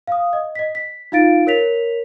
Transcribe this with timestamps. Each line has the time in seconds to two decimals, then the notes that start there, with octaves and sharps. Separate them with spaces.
0.07 F5 D#6
0.33 D#5
0.55 D#5 B6
0.75 B6
1.12 D#4 F4 F5 A6 D7
1.47 A#4 C#5 B6 F7